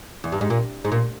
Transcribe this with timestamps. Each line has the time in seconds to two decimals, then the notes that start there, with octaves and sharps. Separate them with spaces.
0.24 E2
0.32 G2
0.41 G#2
0.50 A#2
0.85 G#2
0.92 A#2